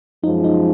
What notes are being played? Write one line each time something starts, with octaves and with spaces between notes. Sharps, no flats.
F#2 F3 G#3 D#4
D#4